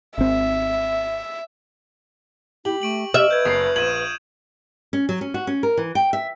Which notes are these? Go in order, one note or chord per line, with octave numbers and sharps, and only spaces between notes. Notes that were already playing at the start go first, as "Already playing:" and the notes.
G#1 C4 E5
E4 G4 F#7
A3 C#6 D7 F#7
G4 E5 F6
B4 G6 G#6
F#1 D#6 C7
A#1 G#6 D#7 E7 F#7
C#4
F#3
C#4
F#4
C#4
A#4
E3
G5
E5